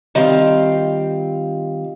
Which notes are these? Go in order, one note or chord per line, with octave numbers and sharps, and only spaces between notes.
D#3 G3 C4 F4 F5